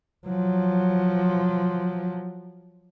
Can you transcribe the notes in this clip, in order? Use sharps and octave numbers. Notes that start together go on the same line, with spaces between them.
F3 F#3